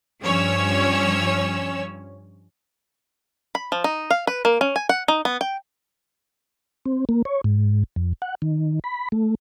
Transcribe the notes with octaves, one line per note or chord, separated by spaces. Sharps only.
G2 F3 C#4 C#5 E6
B5
F3
D#4
F5
B4
A#3
C#4
G#5
F#5
D#4
B3
G5
C4
A#3
C#5
G#2
F2
F#5
D#3
B5
A3